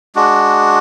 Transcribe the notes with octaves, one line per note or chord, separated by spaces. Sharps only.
G#3 D4 F#4